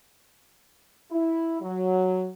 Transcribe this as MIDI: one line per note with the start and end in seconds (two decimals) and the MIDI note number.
1.12 1.58 64
1.61 2.29 54